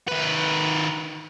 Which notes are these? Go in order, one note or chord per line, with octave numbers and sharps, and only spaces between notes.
D#3 B4